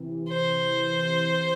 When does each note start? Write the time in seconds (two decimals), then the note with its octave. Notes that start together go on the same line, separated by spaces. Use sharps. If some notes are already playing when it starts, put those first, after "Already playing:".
Already playing: C3 E3
0.29 C5